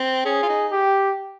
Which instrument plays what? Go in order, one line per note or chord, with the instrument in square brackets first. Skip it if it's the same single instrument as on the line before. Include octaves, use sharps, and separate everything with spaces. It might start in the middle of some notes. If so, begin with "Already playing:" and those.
Already playing: [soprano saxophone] C4
[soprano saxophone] C#4 [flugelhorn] G#4
[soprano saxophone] F4
D#4
[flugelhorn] G4